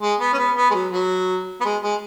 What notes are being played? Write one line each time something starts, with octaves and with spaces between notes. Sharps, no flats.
G#3
B3
C#4
B3
B3
G#3
F#3
F#3
B3
G#3
G#3